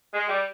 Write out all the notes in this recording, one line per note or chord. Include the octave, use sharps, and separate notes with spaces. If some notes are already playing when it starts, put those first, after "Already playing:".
G#3
G3